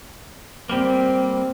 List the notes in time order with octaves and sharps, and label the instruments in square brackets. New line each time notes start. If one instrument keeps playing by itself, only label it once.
[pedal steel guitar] G3 A#3 [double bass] C4